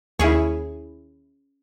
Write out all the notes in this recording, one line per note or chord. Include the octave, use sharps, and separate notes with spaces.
D#2 C#4 E4 G#4 C#5